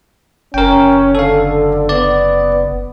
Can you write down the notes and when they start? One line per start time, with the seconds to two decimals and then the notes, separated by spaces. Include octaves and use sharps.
0.54 F#1 C#4 A#4 G5
1.15 D3 A4 F5
1.89 B3 D5